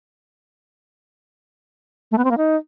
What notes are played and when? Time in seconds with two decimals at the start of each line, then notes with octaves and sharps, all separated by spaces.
2.11 A3
2.18 B3
2.24 C4
2.31 A#3
2.37 D#4